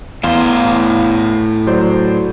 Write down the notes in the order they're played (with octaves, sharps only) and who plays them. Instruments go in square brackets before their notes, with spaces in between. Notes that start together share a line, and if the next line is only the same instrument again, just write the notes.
[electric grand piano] E2 F5 E7 [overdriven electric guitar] A2 C6
[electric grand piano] F#3 C5 D5